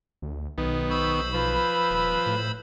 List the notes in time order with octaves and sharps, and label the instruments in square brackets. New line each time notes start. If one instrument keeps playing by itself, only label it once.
[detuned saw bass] D2
[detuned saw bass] B1 [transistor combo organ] D#3 B3
[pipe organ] C5 B5 E6 [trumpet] C#6
[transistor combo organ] F3 [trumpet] B4
[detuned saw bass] D#1
A2